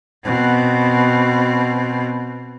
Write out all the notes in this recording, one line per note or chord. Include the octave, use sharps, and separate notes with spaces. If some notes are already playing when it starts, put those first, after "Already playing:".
B2 C4